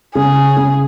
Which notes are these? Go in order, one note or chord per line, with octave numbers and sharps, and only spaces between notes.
C#3 G#4
C#3